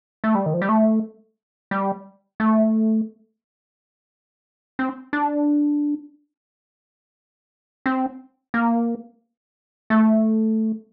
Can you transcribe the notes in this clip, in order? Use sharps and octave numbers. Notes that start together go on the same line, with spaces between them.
A3
G3
D#3
F3
G3
A3
G3
A3
C4
D4
C4
A#3
A3